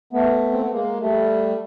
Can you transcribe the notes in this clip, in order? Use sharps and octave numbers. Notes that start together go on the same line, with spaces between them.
A3 B3
C4
B3
G#3 A#3
G3 A3